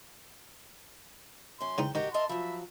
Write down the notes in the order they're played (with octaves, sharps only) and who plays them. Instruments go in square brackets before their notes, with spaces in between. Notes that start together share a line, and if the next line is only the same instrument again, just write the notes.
[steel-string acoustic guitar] F#2 C#4 [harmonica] C6
[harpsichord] C#3 E3 D#4 [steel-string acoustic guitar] G5
[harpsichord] D#3 [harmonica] F#4 [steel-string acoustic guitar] G4 A#4 D#5
[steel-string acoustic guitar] A#4 D#5 E5 [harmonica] A5 C6
[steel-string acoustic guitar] F3 F#3 [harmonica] E5 B5